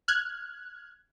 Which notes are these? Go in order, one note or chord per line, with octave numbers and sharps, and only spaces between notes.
F6 F#6 G#6